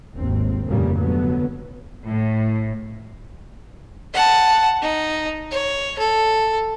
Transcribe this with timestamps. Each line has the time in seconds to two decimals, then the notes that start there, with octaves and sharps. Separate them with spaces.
0.15 G#1 D#2 C4
0.66 F1 G2 A#2 C#3 G3 A#3
0.97 D2 G2 D3 F#3 B3
2.07 A2
4.14 F#5 A5
4.82 D#4
5.51 C#5
5.99 A4